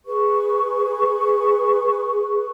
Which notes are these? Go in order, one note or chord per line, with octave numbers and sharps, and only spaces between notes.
G#4 B4 C#6